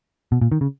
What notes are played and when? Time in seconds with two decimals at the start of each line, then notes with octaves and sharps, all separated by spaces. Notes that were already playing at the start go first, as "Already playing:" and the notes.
0.32 B2
0.42 A#2
0.52 D#3
0.61 C#3